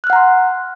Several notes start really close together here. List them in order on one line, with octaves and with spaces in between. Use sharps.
F#6 F6 F#5 A#5 C6